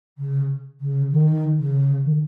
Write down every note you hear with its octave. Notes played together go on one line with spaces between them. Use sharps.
C#3
C#3
D#3
C#3
D#3